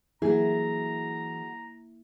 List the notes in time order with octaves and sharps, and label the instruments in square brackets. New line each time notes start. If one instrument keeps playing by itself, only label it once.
[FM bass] E3 [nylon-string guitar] F#3 G#4 [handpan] A#3 E4 [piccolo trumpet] A#5